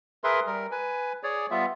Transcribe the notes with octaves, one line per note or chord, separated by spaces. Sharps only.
G#4 A#4 B4 E5 C6
G3 A#4
B4 G#5
G#4 C#5 D5
G3 B3 F4 E5